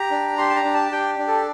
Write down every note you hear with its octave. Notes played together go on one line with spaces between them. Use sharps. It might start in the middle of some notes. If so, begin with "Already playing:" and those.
Already playing: G4 A#5
D4
G4 C6
A5
A#5
D4
A5
G4 G5
D4
A4